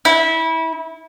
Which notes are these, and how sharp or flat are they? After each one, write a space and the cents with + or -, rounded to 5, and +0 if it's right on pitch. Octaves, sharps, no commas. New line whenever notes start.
E4 -25